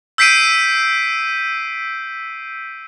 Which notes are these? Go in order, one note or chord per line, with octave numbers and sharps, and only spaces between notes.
E6 G6 B6 C7 D7 D#7